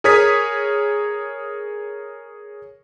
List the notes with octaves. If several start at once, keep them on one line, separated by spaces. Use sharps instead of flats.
G#4 A#4 C#5 D#6 G#6 B6